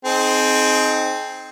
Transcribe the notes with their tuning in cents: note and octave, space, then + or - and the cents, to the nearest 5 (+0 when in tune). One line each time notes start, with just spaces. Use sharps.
C4 +0 D#4 +0 G#4 +35